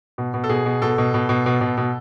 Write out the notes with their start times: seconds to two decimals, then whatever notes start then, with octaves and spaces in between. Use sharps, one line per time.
0.18 B2
0.34 B2
0.44 A4
0.49 B2 G#4
0.66 B2
0.82 B2 A4
0.98 B2
1.14 B2
1.29 B2
1.46 B2
1.61 B2
1.77 B2